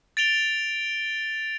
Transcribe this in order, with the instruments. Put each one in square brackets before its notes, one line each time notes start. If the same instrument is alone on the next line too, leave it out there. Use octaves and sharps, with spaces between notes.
[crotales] A6 D7 F7 G7